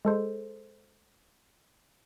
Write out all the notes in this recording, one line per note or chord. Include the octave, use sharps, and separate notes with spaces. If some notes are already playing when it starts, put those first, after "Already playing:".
G#3 A4 C5